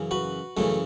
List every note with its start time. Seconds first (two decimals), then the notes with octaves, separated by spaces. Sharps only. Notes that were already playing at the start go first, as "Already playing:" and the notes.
Already playing: F#2 C#3 E3
0.11 F#4 B4
0.57 F#2 C#3 E3 A3